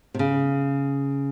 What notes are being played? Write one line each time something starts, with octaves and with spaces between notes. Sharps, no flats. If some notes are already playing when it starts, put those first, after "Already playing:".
C3
C#3